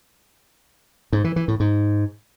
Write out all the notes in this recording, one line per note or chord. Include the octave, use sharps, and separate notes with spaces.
G#2
E3
E3
A2
G#2